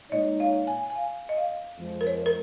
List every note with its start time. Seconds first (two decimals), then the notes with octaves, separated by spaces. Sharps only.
0.12 A#2 G#3 D#4 C#5 D#5
0.40 F5
0.67 G#5
0.90 G#5
0.95 F5
1.29 D#5
1.37 F5
1.78 F2 F3 G#3
2.01 A#4
2.07 C#5
2.26 A#4